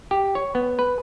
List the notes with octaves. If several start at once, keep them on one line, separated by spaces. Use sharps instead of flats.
G4
C#5
B3
B4